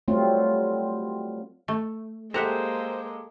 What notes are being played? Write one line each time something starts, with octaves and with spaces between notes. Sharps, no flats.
F#3 G3 A3 C4 F4
A3
G#3 A#3 G4 A4 C5 E5 F#5 A#5